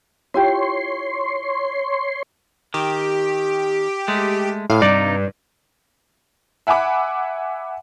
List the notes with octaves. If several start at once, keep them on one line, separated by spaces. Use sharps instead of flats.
E4 F4 G4 C#5 C6
D#3 G4
G#3 A3
A2 F5
G2 C3 D#4 D5
E5 F#5 G#5 B5 D6